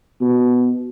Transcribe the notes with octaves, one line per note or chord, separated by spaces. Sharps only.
B2